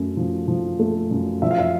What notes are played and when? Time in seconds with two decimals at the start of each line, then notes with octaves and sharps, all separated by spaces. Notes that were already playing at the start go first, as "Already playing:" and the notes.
Already playing: F#2 A3
0.17 F3
0.48 F3
0.79 A3
1.11 F#2
1.42 F3 E5
1.51 F5
1.58 E5